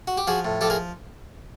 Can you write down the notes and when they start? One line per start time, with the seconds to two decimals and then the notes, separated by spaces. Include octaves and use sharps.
0.07 F#4
0.17 G4
0.27 F3 F#4 G#4
0.45 A2
0.61 F3 G4 A4
0.70 G#4 A#4